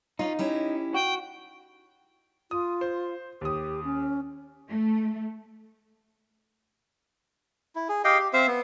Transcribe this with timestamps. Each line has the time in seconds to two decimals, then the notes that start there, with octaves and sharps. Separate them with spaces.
0.19 C#4 D#4 F4
0.39 C#4 E4 G4
0.94 F#4 G5
2.51 F4 D#6
2.81 C5
3.41 D#2 G4 D#6
3.84 C#4
4.69 A3
7.75 E4
7.89 G#4
8.04 G4 D#5 F5 G5
8.19 G4
8.33 C4 C5 E5 F5
8.47 B3